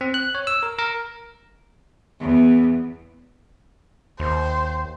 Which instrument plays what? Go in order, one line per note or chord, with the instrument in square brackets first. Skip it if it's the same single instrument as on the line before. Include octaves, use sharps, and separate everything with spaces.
[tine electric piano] C4
F#6
C#5
E6
A#4
A#4
[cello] E2
[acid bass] D#2 [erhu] C5